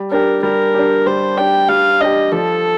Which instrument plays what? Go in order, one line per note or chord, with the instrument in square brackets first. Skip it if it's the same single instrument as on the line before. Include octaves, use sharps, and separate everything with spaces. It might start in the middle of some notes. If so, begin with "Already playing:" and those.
Already playing: [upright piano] G3
[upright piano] D4 G4 [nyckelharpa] A#4
[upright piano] G3 [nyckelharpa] A#4
[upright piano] D4 G4
[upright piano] G3 [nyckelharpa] C5
[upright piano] D4 G4 [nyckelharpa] G5
[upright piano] G3 [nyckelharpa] F5
[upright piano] D4 G4 [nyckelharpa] D#5
[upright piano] F3 [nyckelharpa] A4